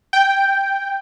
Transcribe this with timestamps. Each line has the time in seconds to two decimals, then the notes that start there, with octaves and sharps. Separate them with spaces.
0.13 G5